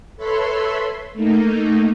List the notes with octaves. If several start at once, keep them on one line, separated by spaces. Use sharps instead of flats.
A4 B4 C#5 E5 B5 C6
A3 A#3 D#4